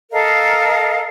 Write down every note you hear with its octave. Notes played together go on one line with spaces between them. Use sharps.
A4 A#4 D#5 F5